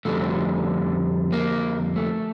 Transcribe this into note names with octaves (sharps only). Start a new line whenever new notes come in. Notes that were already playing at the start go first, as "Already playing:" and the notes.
F2 D3 G3 A3
A#3
A3